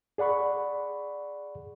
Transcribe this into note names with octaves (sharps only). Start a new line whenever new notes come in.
G#4 D5 F#5 B5 C#6